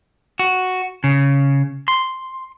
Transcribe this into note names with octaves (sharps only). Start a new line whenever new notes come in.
F#4
C#3
C6